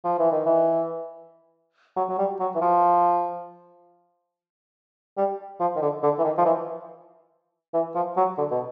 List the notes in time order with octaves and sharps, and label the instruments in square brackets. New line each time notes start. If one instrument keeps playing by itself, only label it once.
[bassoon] F3
E3
D#3
E3
F#3
F#3
G3
F#3
E3
F3
G3
F3
D#3
D3
D3
E3
D#3
F3
E3
E3
F3
F#3
D3
B2